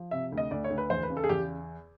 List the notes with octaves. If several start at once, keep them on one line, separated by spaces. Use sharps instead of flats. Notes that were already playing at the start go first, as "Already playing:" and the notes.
Already playing: F3
C3 E5
D2
D#5
D2 D5
C#5
D2
B4
E2 C5
B4
C#3
A4
G#4
E2 G4